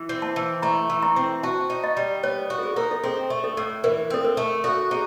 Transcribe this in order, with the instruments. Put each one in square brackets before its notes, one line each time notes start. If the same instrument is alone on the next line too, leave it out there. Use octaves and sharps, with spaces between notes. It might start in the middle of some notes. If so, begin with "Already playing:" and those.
Already playing: [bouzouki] E3
C4
[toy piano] A5
[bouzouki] E3
[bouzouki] A3 [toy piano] A#5
[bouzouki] E3
[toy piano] A#5
[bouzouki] C4
[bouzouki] F#4 [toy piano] A5
[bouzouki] D#4
[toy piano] D#5
[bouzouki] G3
[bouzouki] B3 [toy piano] C#5
[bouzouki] F#4
[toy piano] A4
G#4
[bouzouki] D#4 [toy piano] A#4
[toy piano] A4
[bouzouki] C4 [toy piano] G#4
[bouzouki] A3
[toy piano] A4
[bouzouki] A2
[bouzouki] E3 [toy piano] A#4
[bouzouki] C4 [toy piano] A4
[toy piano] A#4
[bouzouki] A3
[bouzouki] F#4 [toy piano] A4
[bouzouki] D#4 [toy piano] G#4